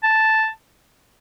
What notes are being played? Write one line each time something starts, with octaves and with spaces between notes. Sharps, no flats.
A5